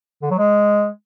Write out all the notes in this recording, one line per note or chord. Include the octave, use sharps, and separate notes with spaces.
D3
F#3
G#3